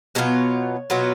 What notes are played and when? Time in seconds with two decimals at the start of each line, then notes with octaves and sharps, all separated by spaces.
0.15 B2 F#3 B3 F4 C#5
0.90 B2 F#3 B3 F4